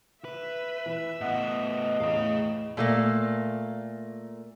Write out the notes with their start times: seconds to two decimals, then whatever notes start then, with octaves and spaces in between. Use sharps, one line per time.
0.25 B4 E5
0.86 E3
1.21 A2 B3 D#5 F#5
2.00 E2 A2 G#4 F5
2.77 A#2 A3 A#3